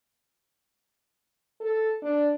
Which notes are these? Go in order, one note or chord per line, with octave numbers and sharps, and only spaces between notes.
A4
D4